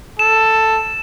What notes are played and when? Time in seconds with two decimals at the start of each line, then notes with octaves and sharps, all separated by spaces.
0.19 A4 E7